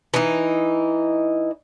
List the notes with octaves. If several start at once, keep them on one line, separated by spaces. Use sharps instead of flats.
E3 D#4